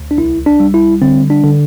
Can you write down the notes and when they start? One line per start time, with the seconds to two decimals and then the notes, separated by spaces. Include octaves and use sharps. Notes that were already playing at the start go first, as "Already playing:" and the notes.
Already playing: D2
0.11 D4
0.18 C2 E4
0.46 D4
0.60 G3
0.74 E4
1.02 D3 C4
1.30 D4
1.44 D3